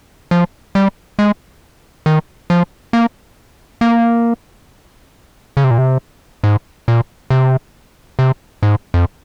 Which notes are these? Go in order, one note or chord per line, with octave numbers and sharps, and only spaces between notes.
F3
G3
G#3
D#3
F3
A#3
A#3
C#3
C3
A#2
C3
G#2
A#2
C3
C3
G#2
F2